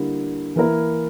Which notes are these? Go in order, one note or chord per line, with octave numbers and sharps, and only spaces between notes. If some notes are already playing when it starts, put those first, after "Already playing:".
Already playing: D3 G3 A#3 E4
E3 A#3 E4 A#4